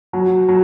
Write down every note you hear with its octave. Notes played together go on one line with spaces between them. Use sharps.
F#3
F#3